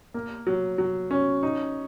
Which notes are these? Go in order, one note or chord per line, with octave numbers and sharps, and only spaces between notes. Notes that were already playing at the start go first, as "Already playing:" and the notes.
A#3
F#3
F#3
C#4
D#4